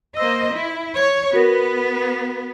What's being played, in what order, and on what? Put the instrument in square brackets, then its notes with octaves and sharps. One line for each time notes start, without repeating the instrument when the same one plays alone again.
[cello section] A#3 C5 D#5 [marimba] E6
[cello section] E4
[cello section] C#5 [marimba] G#6
[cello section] B3 [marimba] F#4 A#4 A#6